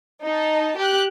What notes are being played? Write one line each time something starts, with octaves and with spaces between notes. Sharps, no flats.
D#4 A5
G4 F#6